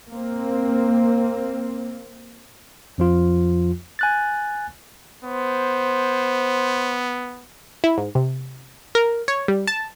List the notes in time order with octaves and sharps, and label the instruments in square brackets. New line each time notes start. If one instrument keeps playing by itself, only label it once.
[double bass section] A#3 C4
[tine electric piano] F2 F3 F4
G#5 F#6 A6
[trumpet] B3 [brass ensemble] C5
[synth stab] E4
G#2
C3
A#4
C#5
G3
A5